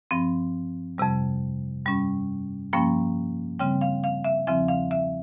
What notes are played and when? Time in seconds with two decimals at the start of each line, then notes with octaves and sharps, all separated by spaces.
0.11 G2 F3 C4
0.98 F2 C3 G3
1.85 G2 G3 C#4
2.73 G2 F3 A#3 C#4 G5
3.59 C#3 G3 C4 G5
3.81 F5
4.04 F5
4.25 E5
4.47 E2 C#3 F3 C4 E5
4.68 F5
4.91 E5